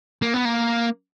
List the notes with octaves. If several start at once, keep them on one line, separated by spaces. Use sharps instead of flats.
A#3
B3
A#3